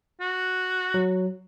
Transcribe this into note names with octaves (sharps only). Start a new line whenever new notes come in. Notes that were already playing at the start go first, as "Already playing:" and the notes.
F#4
F#3